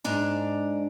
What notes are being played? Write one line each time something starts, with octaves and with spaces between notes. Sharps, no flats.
G#2 D4 A#5